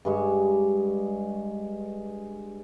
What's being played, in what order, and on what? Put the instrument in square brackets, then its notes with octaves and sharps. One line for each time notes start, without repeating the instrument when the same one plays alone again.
[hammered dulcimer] G2 G#3 C#6